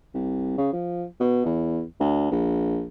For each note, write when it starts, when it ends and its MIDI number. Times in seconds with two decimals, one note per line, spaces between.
0.14 0.53 36
0.58 0.68 49
0.73 1.04 53
1.20 1.43 47
1.45 1.82 40
2.00 2.28 38
2.31 2.86 34